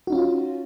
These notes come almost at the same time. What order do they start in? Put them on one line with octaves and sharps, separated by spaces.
F#4 D#4 C#4 F4